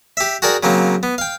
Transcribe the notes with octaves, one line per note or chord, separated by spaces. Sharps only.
G4 E5
F#4 G#4 A#4 D5 G5
C#3 F#3 A#3 C4
B3
F5 G5